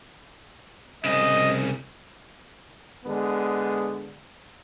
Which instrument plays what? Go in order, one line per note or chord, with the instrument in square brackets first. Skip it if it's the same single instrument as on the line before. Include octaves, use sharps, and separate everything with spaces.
[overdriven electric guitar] C2 C#3 [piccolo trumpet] D#5
[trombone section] D3 G#3 B3